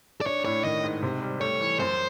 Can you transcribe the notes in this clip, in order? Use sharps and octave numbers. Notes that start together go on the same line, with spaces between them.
D5
D4 C#5
A2 C#5
D#3 D#5
G#2
C3
G3
A3 C#5
E3
F#2 C5